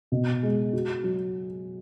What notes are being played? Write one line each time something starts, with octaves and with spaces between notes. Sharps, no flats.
B2
G#3
F#4
F#3